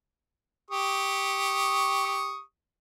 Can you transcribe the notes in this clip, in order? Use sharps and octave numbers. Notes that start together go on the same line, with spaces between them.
G4 C#6 D#6